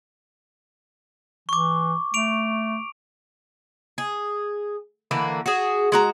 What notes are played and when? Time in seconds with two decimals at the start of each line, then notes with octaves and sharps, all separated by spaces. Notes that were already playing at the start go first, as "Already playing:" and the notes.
1.49 E3 C#6 D6
2.14 A3 D7 F7
3.98 G#4
5.11 D3 E3 A#3 B4
5.46 F#4 G#4
5.92 G#3 F#4 A#5